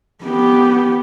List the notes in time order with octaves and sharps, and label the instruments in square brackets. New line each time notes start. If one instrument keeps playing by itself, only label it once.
[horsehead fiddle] B3 G4